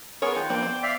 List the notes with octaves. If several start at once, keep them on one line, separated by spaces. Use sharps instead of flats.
B3 G#4 A#4 C#5 C#6
D#3 F4 B4 G#5 G6
F3 A#3 D4 C5 D5 G5 D6
B3 C5 D7
D5 E5 F5 B6